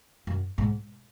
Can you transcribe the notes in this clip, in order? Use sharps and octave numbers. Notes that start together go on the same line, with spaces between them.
F#2
G#2